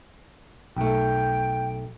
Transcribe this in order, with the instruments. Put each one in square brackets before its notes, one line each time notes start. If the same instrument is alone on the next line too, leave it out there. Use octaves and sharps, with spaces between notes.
[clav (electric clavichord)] B1 A3 [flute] G5